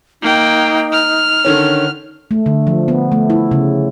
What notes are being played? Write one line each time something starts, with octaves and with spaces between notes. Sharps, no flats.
A#3 D#4 G5
F6
D3 D#3 C#4
A3
D3
F3
B3
A3
E4
C#3